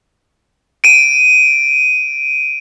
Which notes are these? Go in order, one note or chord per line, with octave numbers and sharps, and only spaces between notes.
D7 D#7